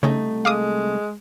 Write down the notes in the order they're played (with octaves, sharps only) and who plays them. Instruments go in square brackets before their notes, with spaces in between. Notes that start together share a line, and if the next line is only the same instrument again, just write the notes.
[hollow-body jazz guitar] C2 A3 D#4 [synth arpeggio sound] C#3
[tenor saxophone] G#3 [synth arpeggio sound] F5 D6 D#6